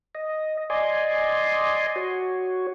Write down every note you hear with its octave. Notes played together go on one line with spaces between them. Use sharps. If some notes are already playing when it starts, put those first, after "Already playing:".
D#5
D5 D#5 G#5 C6
F#4 C#5